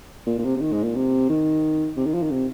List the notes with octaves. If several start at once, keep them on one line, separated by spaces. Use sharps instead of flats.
A#2
A#2
C3
C3
D#3
G#2
A#2
C3
D#3
C3
D#3
F3
D#3
C3